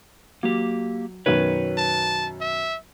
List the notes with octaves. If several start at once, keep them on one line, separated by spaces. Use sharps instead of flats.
F#3 A#3 G4
F#2 B2 D#3 B4 C#5
A5
E5